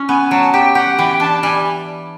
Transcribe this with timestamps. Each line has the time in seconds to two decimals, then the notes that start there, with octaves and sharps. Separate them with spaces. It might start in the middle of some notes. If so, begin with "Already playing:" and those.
Already playing: C#4
0.09 B3 G#5
0.31 F#3 A5
0.53 G4 G5
0.75 G4 F#5
0.98 E3 G5
1.20 D4 A5
1.43 G3 G#5